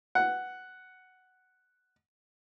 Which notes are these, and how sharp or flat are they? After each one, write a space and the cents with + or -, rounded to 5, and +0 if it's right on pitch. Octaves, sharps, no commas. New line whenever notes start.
F#5 +5